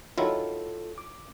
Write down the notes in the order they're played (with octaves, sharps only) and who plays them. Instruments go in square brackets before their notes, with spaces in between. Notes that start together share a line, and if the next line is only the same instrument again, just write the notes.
[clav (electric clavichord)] D#3 F#3 E4 [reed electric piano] F4 A4
[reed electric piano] D6